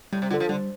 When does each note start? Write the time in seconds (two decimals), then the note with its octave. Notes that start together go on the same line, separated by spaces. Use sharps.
0.13 A2 G3
0.22 C3
0.31 D3 F4 A4
0.40 F3
0.49 D3 G3